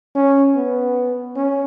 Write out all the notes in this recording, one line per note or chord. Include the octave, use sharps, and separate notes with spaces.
C#4
B3
C#4